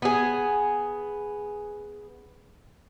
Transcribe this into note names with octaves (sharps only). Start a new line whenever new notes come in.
B3 G#4